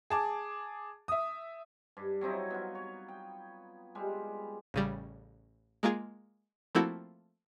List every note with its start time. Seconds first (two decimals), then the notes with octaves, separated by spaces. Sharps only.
0.10 G#4 A5 D6
1.08 E5 D#6
1.97 G2
2.21 F#3 C4 D#4 E4
2.50 B3 F4
2.75 C#5
3.08 G5
3.95 G3 G#3
4.74 A1 C#3 G3
5.83 G#3 A#3 F4 G#4
6.75 F3 A3 A#3 C4 E4 F#4